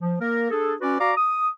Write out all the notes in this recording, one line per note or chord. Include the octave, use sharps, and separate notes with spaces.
F3
A#3 A#4
D4 G#4 A4
C#4 F#4 B4 D5
F#4 D5 F5 A#5 D6
D#6